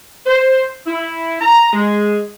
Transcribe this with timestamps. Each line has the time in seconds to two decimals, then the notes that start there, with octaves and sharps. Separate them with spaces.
0.26 C5
0.87 E4
1.41 A#5
1.73 G#3